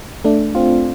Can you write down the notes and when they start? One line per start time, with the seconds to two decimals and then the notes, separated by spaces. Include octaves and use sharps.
0.25 A3 D4
0.55 C4 F4